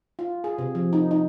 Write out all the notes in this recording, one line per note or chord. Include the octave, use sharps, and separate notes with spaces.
F4
G#4
C3
F3
D#4
D#4